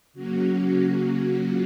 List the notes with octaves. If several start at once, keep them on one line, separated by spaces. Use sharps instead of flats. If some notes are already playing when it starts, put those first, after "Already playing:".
C#3 F#3 A#3 C#4 F#4
F#4
F4